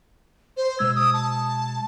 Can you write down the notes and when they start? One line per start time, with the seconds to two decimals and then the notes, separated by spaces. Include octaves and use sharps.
0.57 C5
0.79 B2 G#3 E6 G#6
0.96 D#6
1.14 A5